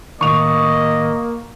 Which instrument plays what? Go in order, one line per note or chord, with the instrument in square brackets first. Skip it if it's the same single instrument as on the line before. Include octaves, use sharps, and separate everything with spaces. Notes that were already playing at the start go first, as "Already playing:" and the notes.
[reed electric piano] A2 D#3 [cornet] A#3 [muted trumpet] D#5 [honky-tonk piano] C#6 F7